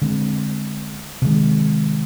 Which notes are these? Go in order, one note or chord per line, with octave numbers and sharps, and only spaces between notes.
D3 G#3 C4
C3 D#3 G#3